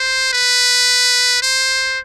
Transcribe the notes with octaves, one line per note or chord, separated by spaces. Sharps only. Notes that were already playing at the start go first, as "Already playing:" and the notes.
Already playing: C5
B4
C5